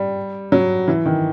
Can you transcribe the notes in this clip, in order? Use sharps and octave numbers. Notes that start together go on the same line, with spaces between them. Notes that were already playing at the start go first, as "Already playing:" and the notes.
Already playing: G3
F#3
E3
D#3